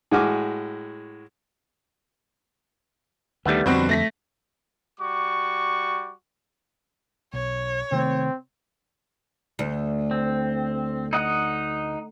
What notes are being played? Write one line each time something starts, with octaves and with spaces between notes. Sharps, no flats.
A2 G#3 F#4 G#5 D6 F6
D2 D#3 G3 A3 B3
F2 B2 D3 G3 C4 F#4
A3 A#6 B6
G3 F#4 C#6 D6
B1 C#5
C3 D#3 A3 C4
D2
C4
D#4 D#5 F#5